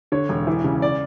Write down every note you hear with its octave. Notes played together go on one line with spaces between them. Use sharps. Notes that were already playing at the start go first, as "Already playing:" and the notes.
D3 C#5
E1
E3
C#3
D5